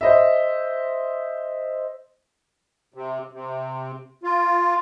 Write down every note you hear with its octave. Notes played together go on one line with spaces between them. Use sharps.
C5 D#5 E5
C3
C3
F4